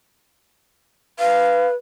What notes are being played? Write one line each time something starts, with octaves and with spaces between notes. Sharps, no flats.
B4 F5